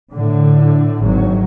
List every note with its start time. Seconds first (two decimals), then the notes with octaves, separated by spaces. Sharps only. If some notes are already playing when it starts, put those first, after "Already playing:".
0.12 A2 D3
1.01 G#1 F#3